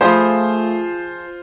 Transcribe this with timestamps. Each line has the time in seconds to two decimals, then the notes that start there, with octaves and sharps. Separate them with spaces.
0.01 F3 A3 F4 G#4 C5 B5